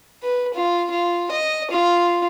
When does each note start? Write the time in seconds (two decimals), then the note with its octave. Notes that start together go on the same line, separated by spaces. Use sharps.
0.23 B4
0.54 F4
0.90 F4
1.31 D#5
1.71 F4